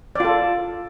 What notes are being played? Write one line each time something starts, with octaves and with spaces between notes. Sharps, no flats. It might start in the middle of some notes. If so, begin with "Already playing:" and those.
F4 A4 D5